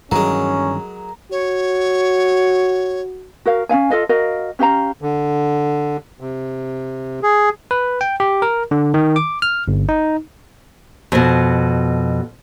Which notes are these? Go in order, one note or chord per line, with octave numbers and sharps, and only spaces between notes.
G2 D#3 E3 F#3 G#3 C#4 A#4
F#4 C#5
F#4 A#4 F5
C#4 D#4 F5 G#5
F4 A4 D#5 F5
F#4 A#4 D#5 F5
C#4 G4 F5 A#5
D3
C3
G#4
B4
G5
G4
A#4
D3
D#3
D6
F6
G1
D#4
F2 B2